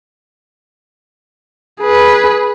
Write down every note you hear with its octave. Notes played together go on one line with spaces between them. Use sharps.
G#4 B4